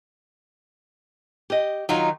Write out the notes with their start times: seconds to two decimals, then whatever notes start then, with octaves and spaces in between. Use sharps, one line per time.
1.50 G4 D#5
1.89 D#3 F#3 D#4 F4